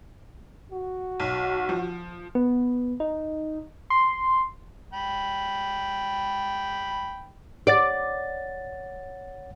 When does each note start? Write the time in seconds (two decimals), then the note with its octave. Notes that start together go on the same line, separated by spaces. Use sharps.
0.72 F#4
1.20 B1
1.69 F3
2.35 B3
3.00 D#4
3.90 C6
4.93 G5 B5
7.67 C#5 D5 F#5 A6